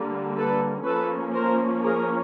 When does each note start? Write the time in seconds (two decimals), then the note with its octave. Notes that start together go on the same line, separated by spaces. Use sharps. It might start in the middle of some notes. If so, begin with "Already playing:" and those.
Already playing: D3 G3 A#3
0.38 A4 B4
0.86 F3 A#3 C#4 A4 B4
1.34 A#4 C5
1.84 G#4 A#4